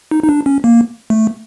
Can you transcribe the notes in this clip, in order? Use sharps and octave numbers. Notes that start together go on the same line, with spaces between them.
D#4
D#4
D4
C#4
A#3
A3